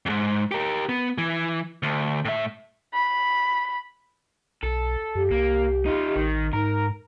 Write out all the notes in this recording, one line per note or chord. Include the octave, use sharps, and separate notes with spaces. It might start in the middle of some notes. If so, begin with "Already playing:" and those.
F2 G#2
G4 A#4
B3
E3
D2
A2 E5
B5
B1 A4
F#2 G4
C2 A#3
D#4 F4
A1 D#3
G#2 D#4 A#4